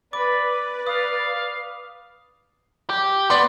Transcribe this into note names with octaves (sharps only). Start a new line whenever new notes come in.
B4 D5 B5 D6
F5 D#6
G4
B3 D5 C6